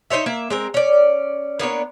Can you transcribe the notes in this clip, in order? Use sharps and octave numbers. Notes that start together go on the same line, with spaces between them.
D#4 C5 C#5 E5
A#3 E5
G#3 C4 A#4
C#4 D5
A#3 B3 D4 C#5